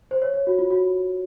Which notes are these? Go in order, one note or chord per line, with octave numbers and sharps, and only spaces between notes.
C5
C#5
C#5
F#4
F4
F#4